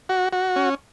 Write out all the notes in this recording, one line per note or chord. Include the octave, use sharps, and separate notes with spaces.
F#4
F#4
C#4